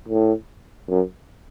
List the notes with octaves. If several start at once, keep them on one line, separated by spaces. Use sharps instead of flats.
A2
F#2